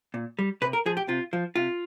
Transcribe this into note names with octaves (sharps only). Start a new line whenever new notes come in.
A#2
G3
C3 B4
A#4
F3 G#4
G4
C3 F4
F3
C3 F4